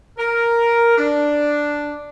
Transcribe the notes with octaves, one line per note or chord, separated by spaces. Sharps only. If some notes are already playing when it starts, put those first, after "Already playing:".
A#4
D4